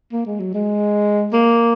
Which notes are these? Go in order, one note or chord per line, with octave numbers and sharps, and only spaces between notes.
A#3
G#3
F#3
G#3
A#3